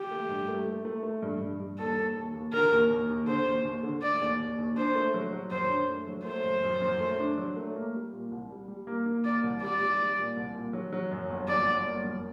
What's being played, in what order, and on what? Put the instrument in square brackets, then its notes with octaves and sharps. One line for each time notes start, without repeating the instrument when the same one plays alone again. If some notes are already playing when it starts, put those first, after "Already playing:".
Already playing: [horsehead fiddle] G4
[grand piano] A3
G2
A3
A3
A3
A3
G2
G2
G2
[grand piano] D#2 [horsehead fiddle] A4
[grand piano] D#2
D#2
D#2
[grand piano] D3 [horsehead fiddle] A#4
[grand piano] D#2
D#2
D#2
[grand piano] D3 [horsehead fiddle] C5
[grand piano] D#2
D#2
D3
[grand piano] A3 [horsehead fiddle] D5
[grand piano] D#2
D#2
D#2
[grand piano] D4 [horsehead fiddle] C5
[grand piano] A3
F#3
F#3
[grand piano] F#2 [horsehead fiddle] C5
[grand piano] D4
A3
F#3
[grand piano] A3 [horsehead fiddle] C5
[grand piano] F#2
F#2
F#2
A3
D4
F#3
A3
A#3
G3
A#2
C2
G3
G3
A#3
A#3
[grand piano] A#3 [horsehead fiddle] D5
[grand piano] C2
[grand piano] G3 [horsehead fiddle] D5
[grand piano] G3
G3
A#2
C2
A#2
F#3
F#3
F#2
G1
[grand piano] F#3 [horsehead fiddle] D5
[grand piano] G1
A#3
F#2